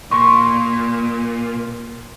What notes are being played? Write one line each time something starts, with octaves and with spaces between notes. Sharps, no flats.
A#2 C6 C#6